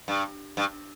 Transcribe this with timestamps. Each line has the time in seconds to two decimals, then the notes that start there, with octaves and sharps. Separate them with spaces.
0.08 G2
0.57 G2